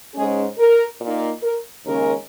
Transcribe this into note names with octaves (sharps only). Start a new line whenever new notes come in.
G#2 G#3 C#4 G#4
A#4
A#2 A#3 D#4
A#4
D#2 C#3 G#3 C#4 A#4